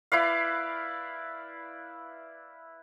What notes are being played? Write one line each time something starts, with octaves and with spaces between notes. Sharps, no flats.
E4 B4 D5 F5